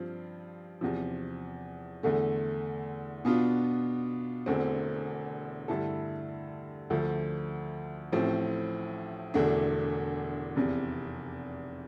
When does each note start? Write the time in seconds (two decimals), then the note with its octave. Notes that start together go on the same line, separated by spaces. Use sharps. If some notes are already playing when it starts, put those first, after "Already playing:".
Already playing: G2 F3 C4 F4
0.81 E2 C3 F3
2.03 E2 D3 A3
3.25 B2 B3 D4 F4
4.46 E1 E2 D3 A3 C4
5.68 G2 D3 A3 E4 A4
6.90 D2 D3 F3 A3
8.12 A1 A2 F3 C4
9.34 E1 E2 D3 A3 D4
10.56 F1 E2 C3